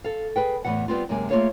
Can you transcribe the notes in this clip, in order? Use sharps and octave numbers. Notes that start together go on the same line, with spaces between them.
A4 F5
G#4 B4 G5
E2 A2 C#3 E3 F#5
G3 B3 C4 F4
F#2 C3 G#3 A#3 G#5
A3 A#3 F4 G#4 C#5 F5